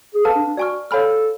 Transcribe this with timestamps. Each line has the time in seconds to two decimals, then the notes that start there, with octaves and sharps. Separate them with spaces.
0.15 G#4
0.24 A4 B4 F5 A5 F6
0.36 D4
0.47 D4
0.57 F#4 D5 G#5 C#6 F6
0.91 A4 C#5 F5 G#5 B5 F6